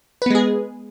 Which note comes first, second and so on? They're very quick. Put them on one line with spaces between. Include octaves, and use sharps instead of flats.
B4 B3 G#3 G#4